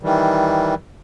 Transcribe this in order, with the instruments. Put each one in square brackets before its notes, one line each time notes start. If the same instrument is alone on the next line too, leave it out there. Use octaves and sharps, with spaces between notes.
[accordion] D#3 E3 G3